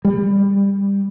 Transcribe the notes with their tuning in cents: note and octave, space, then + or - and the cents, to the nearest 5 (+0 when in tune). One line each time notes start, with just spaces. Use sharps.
G3 +20